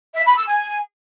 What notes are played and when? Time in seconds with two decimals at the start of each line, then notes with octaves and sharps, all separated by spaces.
0.15 E5
0.26 B5
0.36 E6
0.47 G#5